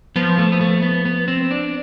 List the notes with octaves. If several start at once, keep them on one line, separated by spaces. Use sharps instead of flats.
F3 B3
A3
B3
A3
B3
B3
C4
D4